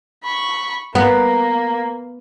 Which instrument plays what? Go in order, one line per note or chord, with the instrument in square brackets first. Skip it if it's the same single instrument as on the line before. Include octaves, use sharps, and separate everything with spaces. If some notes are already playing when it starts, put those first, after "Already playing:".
[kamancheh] B5 C#6
[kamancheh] A#3 [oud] B3